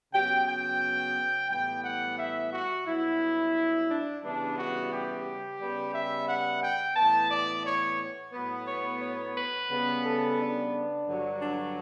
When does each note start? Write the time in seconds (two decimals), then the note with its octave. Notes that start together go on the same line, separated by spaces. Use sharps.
0.12 C#3 F#3 B3 G5
0.47 G5
1.49 A2 E3 G3 B3 G5
1.83 F#5
2.17 E5
2.52 F#4
2.85 G2 F#3 B3 E4
3.88 D4
4.22 C#3 E3 G3 B3 D4
4.57 F#4
4.91 G4
5.60 C#3 G3 B3
5.94 E5
6.28 F#5
6.63 G5
6.96 A2 E3 B3 A5
7.30 D5
7.65 C#5
8.33 A2 F#3 B3
8.67 C#5
9.02 C#5
9.36 B4
9.70 C#3 G3 B3
10.04 A4
10.39 D4
11.07 G2 D3 F#3
11.41 D4